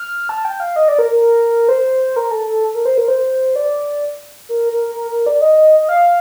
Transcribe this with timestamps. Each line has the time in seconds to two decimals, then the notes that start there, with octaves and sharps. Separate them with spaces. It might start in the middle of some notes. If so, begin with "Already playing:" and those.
Already playing: F6
0.29 A5
0.45 G5
0.60 F5
0.76 D#5
0.88 D5
0.99 A#4
1.11 A#4
1.69 C5
2.16 A#4
2.31 A4
2.47 A4
2.74 A#4
2.86 C5
2.98 A#4
3.08 C5
3.56 D5
4.49 A#4
4.72 A#4
4.95 A#4
5.11 A#4
5.26 D5
5.41 D#5
5.80 D#5
5.89 F5